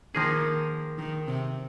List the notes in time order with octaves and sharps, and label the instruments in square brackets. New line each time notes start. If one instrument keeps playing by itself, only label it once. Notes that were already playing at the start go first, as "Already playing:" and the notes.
[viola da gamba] D#3 [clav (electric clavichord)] F3 A#3 G#4
[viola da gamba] D#3
C3